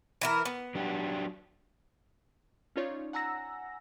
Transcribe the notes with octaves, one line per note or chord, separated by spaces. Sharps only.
E3 E4 A#4
B3
F#3 D4 G4
C#4 D#4 F4 C#5 D5
F#5 G#5 A#5 E6 A#6